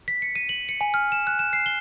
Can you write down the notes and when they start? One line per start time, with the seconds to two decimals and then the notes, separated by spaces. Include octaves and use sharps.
0.08 B6
0.22 C#7
0.35 D#7
0.49 F#7
0.69 C#7
0.81 G#5
0.94 F6
1.12 E7
1.27 F#6
1.39 E7
1.53 C7
1.66 G7